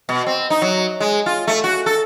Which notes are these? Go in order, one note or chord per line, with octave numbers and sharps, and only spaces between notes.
B2
C4
D#4
F#3
G#3
F4
A3
F#4
A4